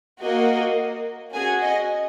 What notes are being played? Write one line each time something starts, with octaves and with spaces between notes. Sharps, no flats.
A#3 F#4 D#5
C#4 F#4 G#4 G#5
D#5